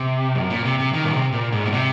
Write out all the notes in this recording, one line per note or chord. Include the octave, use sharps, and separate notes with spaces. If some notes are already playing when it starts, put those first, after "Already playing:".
Already playing: C3
F#2
A#2
C3
C3
D#3
A#2
C3
A#2
G#2
A#2
C3